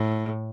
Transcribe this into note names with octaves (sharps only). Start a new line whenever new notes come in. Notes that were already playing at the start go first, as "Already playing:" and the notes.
Already playing: A2